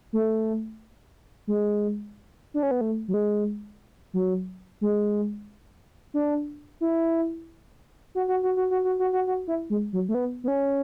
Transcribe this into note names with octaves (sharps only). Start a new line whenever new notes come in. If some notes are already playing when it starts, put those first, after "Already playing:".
A3
G#3
D4
C#4
B3
A3
F#3
G#3
F#3
G#3
D4
E4
F#4
F#4
F#4
F#4
F#4
F#4
F#4
F#4
F#4
E4
G#3
F#3
A3
B3
B3
C#4